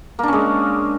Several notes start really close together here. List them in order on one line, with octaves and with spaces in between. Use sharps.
A#3 D4 C#4 G#3